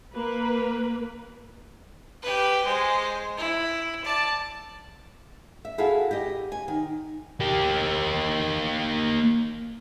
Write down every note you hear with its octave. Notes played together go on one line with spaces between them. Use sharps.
A#3 B4
G4 B4
G#3 C5
E4
D5 A5
E5
E4 F#4 G#4 A4 E5 F5
G4 D#5
G#5
D#3
A#3 G4